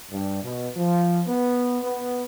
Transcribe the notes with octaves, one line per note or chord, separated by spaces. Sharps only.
G2
B2
F3
B3
B3